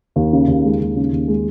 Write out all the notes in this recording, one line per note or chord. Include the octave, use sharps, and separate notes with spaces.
D#2
C#3
D#2
G#3
D#2
C#3
D#2
G#3